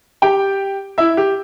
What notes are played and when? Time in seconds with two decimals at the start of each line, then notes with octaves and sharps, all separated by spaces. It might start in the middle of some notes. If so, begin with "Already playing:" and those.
0.22 G4 G5
0.98 E4 E5
1.17 G4